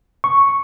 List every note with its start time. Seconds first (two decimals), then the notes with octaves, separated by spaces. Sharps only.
0.24 C#6